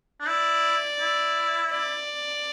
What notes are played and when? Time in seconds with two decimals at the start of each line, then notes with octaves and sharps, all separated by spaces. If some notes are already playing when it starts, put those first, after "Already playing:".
0.20 D4
0.27 E4 D5
1.00 E4
1.72 D5